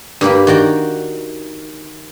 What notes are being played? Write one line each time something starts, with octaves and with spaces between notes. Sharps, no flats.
G2 A#3 G4 B5
D#3 F#4 D5 G5